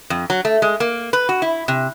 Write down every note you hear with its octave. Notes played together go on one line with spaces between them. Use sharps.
F2
F#3
A3
G#3
A#3
B4
F#4
E4
C3